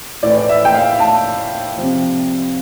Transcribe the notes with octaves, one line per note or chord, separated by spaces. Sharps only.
A2 E3 D5
D5
E5
G5
F5
A5
C3 F3